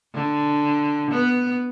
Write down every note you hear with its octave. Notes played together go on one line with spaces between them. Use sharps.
D3
B3